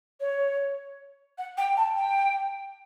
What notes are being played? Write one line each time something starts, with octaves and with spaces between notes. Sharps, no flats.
C#5
F#5
G5
A5
G5